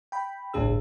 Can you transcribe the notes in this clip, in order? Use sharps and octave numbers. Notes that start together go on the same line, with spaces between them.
G5 B5
G1 C2 A2 D4 G#4 E6